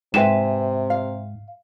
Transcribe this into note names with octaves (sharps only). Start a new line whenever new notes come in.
G#2 C3 G#4 B4 C5 E5 G5 E7
F5